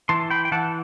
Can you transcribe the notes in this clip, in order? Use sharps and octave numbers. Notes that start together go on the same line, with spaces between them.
E3 A5 C6
G5 B5
G5
E3 F#5 A5